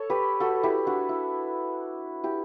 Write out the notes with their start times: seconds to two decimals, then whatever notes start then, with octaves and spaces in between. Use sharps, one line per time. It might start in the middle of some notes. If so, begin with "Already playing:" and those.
Already playing: A4 C#5
0.10 G4 B4
0.40 F#4 A4
0.63 E4 G4
0.87 D4 F#4
1.09 E4
2.24 E4 G4